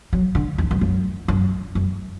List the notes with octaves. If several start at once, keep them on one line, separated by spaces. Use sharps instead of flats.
F#3
D3
E2
F#2
F#2
F#2
F#2